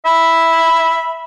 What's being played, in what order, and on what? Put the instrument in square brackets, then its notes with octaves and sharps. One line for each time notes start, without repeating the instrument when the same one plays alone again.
[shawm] E5 [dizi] B5